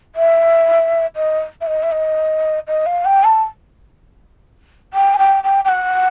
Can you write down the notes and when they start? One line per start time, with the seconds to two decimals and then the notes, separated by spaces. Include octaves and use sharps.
0.15 E5
1.16 D#5
1.61 E5
1.67 D#5
1.83 E5
1.91 D#5
2.68 D#5
2.86 F5
3.05 G5
3.24 A5
4.94 G5
5.14 G#5
5.18 G5
5.44 G5
5.65 G5
5.69 F#5